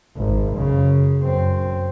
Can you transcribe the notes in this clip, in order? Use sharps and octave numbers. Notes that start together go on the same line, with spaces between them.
G#1
F#2 C#3
F#2 C4